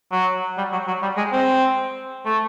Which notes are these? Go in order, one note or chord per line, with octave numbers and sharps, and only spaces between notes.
F#3
G3
F#3
F#3
G3
G#3
C4
A3